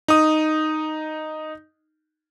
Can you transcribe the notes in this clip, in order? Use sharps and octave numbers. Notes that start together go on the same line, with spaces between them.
D#4 D#6